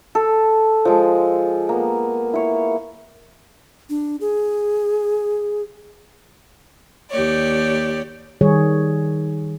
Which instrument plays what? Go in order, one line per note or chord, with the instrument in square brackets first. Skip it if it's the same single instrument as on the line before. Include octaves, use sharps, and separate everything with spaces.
[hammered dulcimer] A4
F3 G#3
A#3 B3
E4 C#5
[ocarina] D4
G#4
[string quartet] D#2 G4 C#5 D5
[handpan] D#3 G3 G#4 C#5